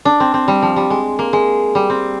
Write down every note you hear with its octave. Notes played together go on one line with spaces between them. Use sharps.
D4
C4
C4
G3
F3
G3
G#3
A#3
G#3
G3
C4